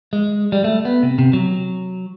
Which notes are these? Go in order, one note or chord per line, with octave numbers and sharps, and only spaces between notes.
G#3
G3
A3
B3
C3
C3
F#3